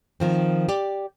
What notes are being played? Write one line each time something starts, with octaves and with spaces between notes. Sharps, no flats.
D#3 F3 C4
G4 D5